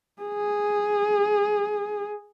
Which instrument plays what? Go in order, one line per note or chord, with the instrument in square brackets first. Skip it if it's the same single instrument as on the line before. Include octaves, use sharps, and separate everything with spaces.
[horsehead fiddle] G#4